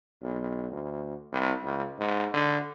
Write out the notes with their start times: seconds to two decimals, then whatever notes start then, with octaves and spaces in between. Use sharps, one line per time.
0.22 B1
0.72 D2
1.33 C2
1.64 C#2
1.99 G#2
2.34 D3